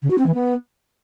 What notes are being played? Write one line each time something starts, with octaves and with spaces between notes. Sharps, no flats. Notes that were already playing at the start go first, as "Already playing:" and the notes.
C#3
F#4
C4
E3
B3